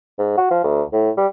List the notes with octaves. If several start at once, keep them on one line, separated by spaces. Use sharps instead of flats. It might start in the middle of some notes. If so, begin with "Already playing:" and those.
G#2
F#4
F3
D2
A2
G3